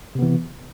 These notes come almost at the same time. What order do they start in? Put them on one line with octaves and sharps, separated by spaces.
C3 B3 E3